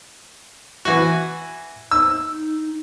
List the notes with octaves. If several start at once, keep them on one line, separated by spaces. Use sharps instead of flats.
E3 F#4
D#4 E6